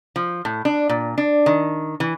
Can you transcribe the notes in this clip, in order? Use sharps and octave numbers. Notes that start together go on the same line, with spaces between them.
F3
A2
D4
A#2
D4
D#3
E3